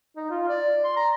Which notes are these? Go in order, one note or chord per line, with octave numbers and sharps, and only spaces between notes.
D#4
F4
D5
C6
A#5